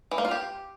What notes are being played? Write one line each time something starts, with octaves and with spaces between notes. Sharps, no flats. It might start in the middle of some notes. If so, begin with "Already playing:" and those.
E3
A#3
F4
G4